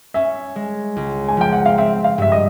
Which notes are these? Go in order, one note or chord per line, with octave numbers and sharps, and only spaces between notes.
C#4 E5
G#3
C#2
G#5
F3 G5
F#5
F5
C4 E5
F5
G2 E5
D#5